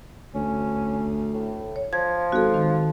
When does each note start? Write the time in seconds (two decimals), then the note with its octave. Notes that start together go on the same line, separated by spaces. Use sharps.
0.35 D2 C#4
1.34 A2
1.76 C#5
1.93 F3 G#6
2.32 G#1 F#4 A4
2.54 D#3